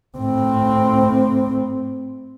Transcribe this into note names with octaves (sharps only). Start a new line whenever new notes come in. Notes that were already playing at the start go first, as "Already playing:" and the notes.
A2 C4